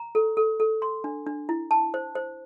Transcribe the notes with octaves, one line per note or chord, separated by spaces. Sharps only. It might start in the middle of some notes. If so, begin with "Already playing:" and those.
Already playing: A#5
A4
A4
A4
C6
D4
D4
E4
A5
C5
C5